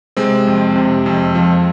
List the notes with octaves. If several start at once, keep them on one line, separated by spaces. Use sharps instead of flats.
C3 G#3 C4
F2
C3
F2
F3